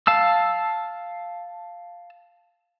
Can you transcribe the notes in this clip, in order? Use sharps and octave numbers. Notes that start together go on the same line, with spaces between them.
F5 A5 E6